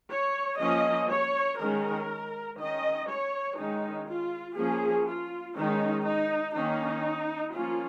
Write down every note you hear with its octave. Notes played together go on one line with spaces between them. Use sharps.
C#5
F3 A#3 C#4 D#5
C#5
D#3 G#3 C#4 A#4
D#3 C#4 D#5
C#5
D#3 G#3 C#4 D#4
F4
F3 A#3 C#4 G#4
F4
D#3 G#3 C#4 D#4
D#4
D#3 A#3 C#4 D#4
F3 A#3 C#4 F4